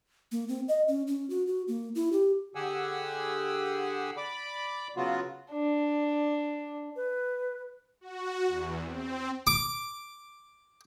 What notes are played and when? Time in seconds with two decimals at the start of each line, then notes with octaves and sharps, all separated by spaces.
0.32 A#3
0.48 C4
0.68 D#5
0.88 C#4
1.07 C#4
1.30 F#4
1.47 F#4
1.68 A#3
1.95 E4
2.13 G4
2.55 D3 G4 G#4 F#5 G#5 E6
4.17 D5 B5 D6
4.96 C#3 F#3 B3 F4 F#4
5.52 D4
6.96 B4
8.01 F#4
8.47 E2
8.86 C4
9.47 D6